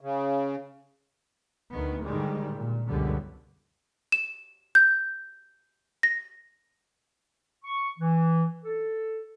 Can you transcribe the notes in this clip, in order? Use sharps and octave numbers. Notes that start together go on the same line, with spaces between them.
C#3
D2 D#3 B3
G#2 D3 D#3 G3 G#3
A#2
C#2 F#2 B2 D3 G3 B3
E7
G6
A#6
C#6
E3
A4